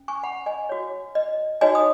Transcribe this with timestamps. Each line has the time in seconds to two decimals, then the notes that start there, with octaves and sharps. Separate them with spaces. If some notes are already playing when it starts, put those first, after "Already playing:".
Already playing: C#4
0.08 G#5 C#6
0.23 F#5 B5
0.46 D#5 G#5
0.69 F#4 C#5
1.15 D#5
1.61 D#4 F#4 C#5 D#5 G#5
1.75 D#6